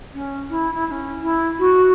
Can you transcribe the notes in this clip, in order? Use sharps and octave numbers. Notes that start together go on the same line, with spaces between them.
C#4
E4
E4
E4
C#4
E4
F#4